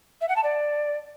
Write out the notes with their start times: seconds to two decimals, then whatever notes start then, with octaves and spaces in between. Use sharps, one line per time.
0.21 E5
0.29 F#5
0.36 A5
0.44 D5